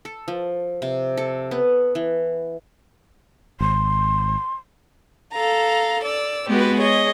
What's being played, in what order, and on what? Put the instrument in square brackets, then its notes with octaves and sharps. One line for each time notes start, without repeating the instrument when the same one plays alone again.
[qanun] A4
F3
C3
A4
B3
E3
[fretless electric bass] G#1 [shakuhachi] C6
[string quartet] A4 F5 A#5
D5 E6
G#3 B3 F#4 G4 B4
G#4 C#5 D#5